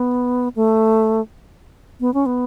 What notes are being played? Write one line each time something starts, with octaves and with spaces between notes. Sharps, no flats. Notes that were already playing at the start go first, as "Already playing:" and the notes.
Already playing: B3
A3
B3
C#4
B3